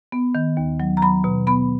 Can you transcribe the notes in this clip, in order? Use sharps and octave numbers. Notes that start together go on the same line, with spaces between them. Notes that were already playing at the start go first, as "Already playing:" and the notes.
B3
D#3
D#2
F#3
A#5
F#3 B5
B2
B3 B5